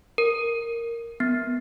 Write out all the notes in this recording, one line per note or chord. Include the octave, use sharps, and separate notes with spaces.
A#4
B3